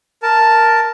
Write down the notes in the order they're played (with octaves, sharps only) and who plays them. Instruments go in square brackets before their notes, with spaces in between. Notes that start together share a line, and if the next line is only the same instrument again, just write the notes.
[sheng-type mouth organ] A#4 A5